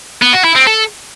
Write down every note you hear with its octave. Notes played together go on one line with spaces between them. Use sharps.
B3
F#4
E4
C4
A4